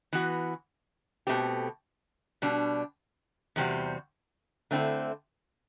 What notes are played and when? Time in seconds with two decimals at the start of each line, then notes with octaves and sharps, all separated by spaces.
0.13 E3 B3 F#4
1.27 B2 A3 C4 G4
2.42 B2 G3 D4
3.56 E2 C3 G3 C4 F#4
4.71 D3 A3 C4 E4